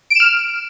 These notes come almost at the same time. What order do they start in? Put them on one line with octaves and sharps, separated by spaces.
D7 E7 F6